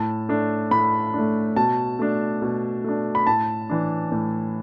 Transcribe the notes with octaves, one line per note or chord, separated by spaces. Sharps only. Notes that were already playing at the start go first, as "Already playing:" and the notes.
Already playing: A2 A5
A3 D4
A2 B5
A3 D4
B2 A5
A3 D4
B2
A3 D4
B5
A2 A5
E3 D4
A2